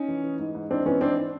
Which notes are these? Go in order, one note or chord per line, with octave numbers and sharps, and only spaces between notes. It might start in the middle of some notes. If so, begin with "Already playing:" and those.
Already playing: C#4 D#4
E3
E3
G#2
G#2
E3 C4 D4
E3 B3 C#4
G#2 C4 D4